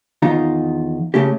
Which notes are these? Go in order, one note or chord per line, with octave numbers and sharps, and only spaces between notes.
E2 D#3 D#4 F4 A#5
C#3 A3 C#4 G4